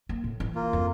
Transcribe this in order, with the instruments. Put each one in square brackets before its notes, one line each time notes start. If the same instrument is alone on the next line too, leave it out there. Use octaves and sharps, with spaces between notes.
[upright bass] A#3
A2
E3
[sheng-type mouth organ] A#3 F4
[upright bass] F2